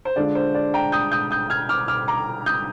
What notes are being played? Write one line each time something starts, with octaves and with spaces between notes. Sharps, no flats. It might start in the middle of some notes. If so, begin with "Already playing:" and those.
C5
D3 G#3 D4 F4 D5
C5
D5
G5 A#5
D#6 G6
D#6 G6
D#6 G6
F6 G#6
D6 F6
D6 F6
A#5 D6
D#6 G6